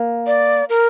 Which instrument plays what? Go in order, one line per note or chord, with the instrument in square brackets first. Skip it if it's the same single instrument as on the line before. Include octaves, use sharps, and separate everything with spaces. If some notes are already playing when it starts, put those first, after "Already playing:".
Already playing: [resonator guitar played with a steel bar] A#3
[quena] D5
A#4